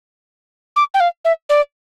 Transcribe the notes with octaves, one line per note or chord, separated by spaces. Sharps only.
D6
G5
F5
E5
D5